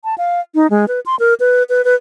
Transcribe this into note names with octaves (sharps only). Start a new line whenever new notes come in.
A5
F5
D#4
G#3
B4
C6
A#4
B4
B4
B4